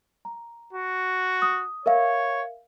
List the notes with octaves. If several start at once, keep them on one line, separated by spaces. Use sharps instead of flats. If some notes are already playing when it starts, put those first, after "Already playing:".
A#5
F#4
D#6
A#4 C#5 E5 F5